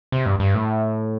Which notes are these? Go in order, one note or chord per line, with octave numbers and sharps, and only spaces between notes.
C3
G2
G2
A2